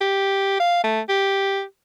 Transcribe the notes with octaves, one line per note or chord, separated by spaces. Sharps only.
G4
F5
A3
G4